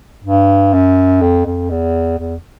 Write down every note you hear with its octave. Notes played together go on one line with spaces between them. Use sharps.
G2
F#2
F2
F2
E2
E2